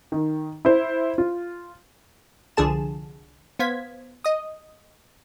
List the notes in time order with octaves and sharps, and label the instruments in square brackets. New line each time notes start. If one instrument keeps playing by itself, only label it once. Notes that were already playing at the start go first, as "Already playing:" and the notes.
[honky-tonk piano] D#3
E4 C5
F4
[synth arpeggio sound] C2 D3 F3 G#4 A5 E7
B3 C5 F5 G#6 B6
D#5 D#6